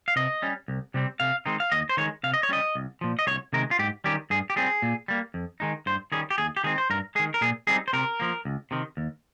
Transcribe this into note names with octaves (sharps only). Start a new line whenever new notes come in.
F5
C3 D#5
G3 C#4
C2
C3 G3 C4
C3 F5
D#3 G#3 C4 D#4
F5
D#2 D#5
C5
D#3 G#3 C#5
C3 F5
D#5
C#5
G3 C#4 D#5
C2
A#2 F3
D#5
C2 C#5
C3 D#3 G#3 A#4
F4
G#2 G4
D#3 G3 C#4 G4
G2 G#4
G4
G3 C4 G#4
A#2
G3 A#3
F2
D#3 G#3 D#4
G2 C5
D#3 G3 C#4 G#4
G4
D#2 G#4
G4
D#3 G#3 C4 G#4
C5
G2 A#4
D#3 G#3 G#4
A#4
A#2 G#4
G3 C4 D#4 G#4
C5
C3 A#4
F3 A#3
C#2
C3 D#3
D#2